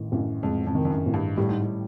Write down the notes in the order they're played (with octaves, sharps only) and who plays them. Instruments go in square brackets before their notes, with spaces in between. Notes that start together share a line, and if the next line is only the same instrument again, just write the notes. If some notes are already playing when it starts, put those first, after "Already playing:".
Already playing: [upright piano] A1 D#3
[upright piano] A1 [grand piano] F#2
[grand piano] F2 [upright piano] G#2
[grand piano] F2
[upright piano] D#3
[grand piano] F2
F#2
[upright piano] A1
[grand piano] G2
[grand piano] A2 [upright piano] G3
[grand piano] G#2
A2